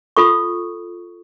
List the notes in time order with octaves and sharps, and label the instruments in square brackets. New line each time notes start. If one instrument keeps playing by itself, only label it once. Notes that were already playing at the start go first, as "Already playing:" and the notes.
[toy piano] F4 A4 C#6